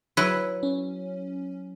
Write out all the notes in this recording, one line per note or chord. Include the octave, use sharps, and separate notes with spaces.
F#3 E4 B4
C#4